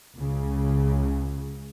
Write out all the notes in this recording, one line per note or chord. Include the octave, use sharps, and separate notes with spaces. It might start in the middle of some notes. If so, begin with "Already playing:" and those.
C#2 C#3